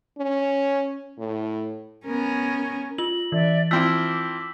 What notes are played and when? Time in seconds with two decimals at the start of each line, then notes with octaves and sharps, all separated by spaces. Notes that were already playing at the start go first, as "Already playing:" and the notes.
0.18 C#4
1.19 A2
2.07 B3 C#4 A#4
2.98 F4 F#7
3.32 E3 D5 E5
3.71 F3 C4 E4 D6 E6 B6